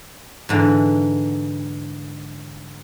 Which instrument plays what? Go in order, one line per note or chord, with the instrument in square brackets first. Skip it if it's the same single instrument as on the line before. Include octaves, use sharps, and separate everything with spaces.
[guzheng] G#2 D3 E3